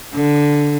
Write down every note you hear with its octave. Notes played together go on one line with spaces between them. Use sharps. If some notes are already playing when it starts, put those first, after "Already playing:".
D3